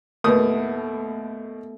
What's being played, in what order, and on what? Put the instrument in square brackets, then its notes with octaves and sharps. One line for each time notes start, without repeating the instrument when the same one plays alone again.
[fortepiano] D#2 A2 D#6 [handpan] A3 B3 [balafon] A#4 B4